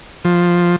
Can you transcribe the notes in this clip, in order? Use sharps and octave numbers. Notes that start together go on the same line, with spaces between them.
F3